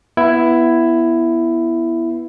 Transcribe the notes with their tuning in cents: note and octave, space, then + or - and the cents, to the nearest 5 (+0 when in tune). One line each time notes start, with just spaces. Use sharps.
B3 -10 E4 +10